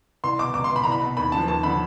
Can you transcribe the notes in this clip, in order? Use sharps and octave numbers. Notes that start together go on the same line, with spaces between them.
C2 C6
B2 D6
C#2 D6
C6
B2
B5
C2 A#5
B5
B2
D#2 B5
C#3 A5
F3
D#2 A5
D3 F3 B5